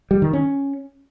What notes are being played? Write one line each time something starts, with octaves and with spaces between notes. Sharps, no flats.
G3
D#3
C#4